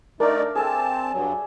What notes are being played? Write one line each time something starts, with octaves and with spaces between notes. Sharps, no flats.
A3 D4 D#4 A#4 D5
C4 G#4 A4 E5 A5
G2 F#3